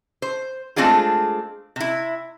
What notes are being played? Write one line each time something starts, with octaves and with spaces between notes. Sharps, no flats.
C5
G#3 A3 C4 D4 F4 G#4
C3 E4